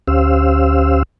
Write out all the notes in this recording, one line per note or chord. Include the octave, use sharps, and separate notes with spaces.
D2 C#4 G4 C5 F5 E6